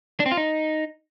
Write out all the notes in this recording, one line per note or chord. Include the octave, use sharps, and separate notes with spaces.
D4
C4
F4
D#4